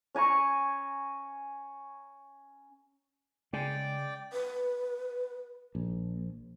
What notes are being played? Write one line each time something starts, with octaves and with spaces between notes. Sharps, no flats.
C#4 G#5 A#5 C#6
C#3 G#3 D5 G5 D6
B4
A#1